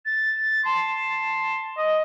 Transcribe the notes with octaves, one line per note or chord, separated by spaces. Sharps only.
A6
A5 C6
D#5